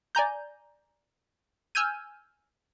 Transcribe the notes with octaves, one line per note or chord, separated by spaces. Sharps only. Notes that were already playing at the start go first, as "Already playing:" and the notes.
D5 G#5 A#5 G6
G#5 E6 F6 G6 G#6 D#7